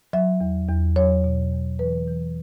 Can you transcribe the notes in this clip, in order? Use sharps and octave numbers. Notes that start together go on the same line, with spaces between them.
F#3 E5
E2
E2
F#3 C#5
B2
E2
E3 B4
E3